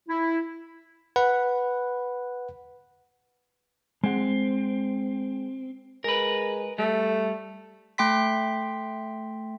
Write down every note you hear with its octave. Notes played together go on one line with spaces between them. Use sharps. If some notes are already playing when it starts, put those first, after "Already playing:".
E4
B4 F#5 B5
G#3 C4 F#5
G#3 A#4 B4
G3 A3
A3 G5 C6 B6